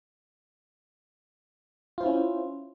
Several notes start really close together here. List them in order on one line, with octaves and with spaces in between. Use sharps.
F4 C5 E4 C#4